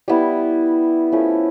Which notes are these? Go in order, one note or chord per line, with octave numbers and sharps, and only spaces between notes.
G3 B3 E4
F3 A3 C#4 E4